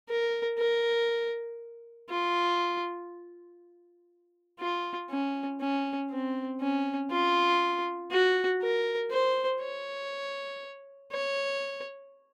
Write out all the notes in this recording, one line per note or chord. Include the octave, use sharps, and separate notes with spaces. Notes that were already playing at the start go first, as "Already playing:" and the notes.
A#4
A#4
F4
F4
C#4
C#4
C4
C#4
F4
F#4
A#4
C5
C#5
C#5